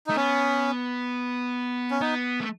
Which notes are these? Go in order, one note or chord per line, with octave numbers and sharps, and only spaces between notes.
A3 D#4
B3 C#4
C#4
B3 D#4
A3